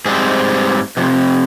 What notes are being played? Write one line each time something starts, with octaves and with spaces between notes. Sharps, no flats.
G#2 G3 C4 G#4
F2 C3